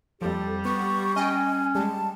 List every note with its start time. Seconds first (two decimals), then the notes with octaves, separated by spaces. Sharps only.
0.22 F2 F3 G3 G4 A4
0.65 B3 C#6
1.16 C#4 D#5 G5 G#5
1.75 G3 G#3 A5